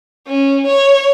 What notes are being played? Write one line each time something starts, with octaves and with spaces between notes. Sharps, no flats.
C#4
C#5